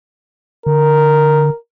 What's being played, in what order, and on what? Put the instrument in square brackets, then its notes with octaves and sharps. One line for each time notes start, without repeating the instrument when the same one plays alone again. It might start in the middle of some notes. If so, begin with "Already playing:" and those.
[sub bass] D3 [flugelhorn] A#4